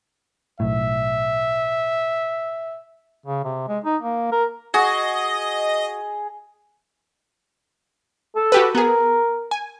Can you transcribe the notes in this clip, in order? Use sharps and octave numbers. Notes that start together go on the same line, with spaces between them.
B1 A2 E5
C#3
C3
G#3
D#4
A#3
A#4
F#4 G#4 D#5
A4
F#4 G4 B4
B3 G#4 A#4
G#5